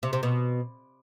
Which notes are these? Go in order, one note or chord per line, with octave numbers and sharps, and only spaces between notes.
C3
C3
B2